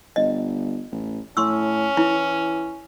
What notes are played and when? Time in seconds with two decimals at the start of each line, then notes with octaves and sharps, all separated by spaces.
0.16 G1 D#5
0.92 A1
1.37 A2 C#4 C6 C#6 E6
1.97 E3 E4